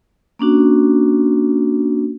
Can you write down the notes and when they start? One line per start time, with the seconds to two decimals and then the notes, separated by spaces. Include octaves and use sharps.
0.39 A#3 C#4 D4 F#4